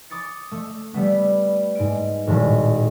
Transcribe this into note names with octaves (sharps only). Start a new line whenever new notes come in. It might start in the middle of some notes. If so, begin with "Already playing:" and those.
D6 D#6 A6 C#7
A3
G3 A3 B3
G#2 D7
D#1 G#1 A2